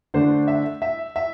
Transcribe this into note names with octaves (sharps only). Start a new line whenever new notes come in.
D3 A3 D4 C5
E5
E5
E5